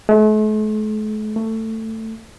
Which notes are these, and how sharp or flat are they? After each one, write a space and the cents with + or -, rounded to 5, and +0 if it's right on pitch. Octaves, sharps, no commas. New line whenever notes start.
A3 -45
A3 +15